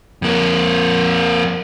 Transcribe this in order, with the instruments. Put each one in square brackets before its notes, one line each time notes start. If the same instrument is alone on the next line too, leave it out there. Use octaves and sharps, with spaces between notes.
[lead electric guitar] F2 A#3